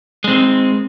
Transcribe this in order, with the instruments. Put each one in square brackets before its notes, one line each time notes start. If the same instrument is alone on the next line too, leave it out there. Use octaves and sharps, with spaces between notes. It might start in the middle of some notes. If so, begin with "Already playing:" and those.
[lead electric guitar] G#3 C4